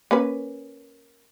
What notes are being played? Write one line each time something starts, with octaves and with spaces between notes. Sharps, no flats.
A#3 C#4 B4